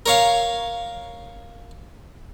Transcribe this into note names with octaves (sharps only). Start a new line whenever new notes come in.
A#4 C#5 F5